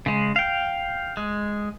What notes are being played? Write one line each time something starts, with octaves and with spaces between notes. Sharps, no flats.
C#3 G#3
F5 G5
G#3